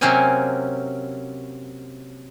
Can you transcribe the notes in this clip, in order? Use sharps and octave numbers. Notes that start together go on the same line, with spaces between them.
C3 F#3 A#3 C4 C#4 G#5